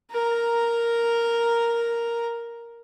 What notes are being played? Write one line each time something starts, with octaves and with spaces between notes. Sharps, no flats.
A#4 A#5